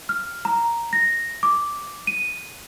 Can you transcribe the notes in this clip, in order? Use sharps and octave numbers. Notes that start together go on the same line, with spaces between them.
F6
A#5
A#6
D6
D#7